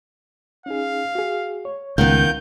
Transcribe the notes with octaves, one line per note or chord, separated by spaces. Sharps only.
C#4 D#4 G#4 F5
F#4 G#4
C#5
C#2 D#3 B3 F5 G6